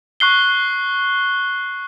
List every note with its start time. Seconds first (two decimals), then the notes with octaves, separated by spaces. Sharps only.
0.20 C#6 F#6 C7 G7